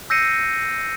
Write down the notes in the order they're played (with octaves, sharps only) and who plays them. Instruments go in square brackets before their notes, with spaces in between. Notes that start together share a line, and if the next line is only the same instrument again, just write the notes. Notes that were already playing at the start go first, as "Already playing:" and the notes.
[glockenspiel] E6 G6 A#6 C7 C#7 D#7